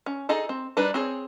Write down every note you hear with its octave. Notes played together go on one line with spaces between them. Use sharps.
C#4
D#4 G#4 A4 D#5
C4
G3 D4 D#4 B4
C4 G#4 C#5